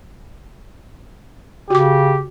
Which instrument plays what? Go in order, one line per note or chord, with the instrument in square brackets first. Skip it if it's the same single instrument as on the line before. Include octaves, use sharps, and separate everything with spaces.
[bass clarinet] C#3 [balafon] F#4 D6 [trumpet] G4